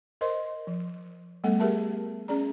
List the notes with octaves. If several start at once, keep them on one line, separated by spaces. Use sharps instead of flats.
A#4 C5 D#5 C6
F3
G3 A3 B3 A4 F#5
G4 G#4 A#4 E5 A5
C#4 G#4 D5 A#5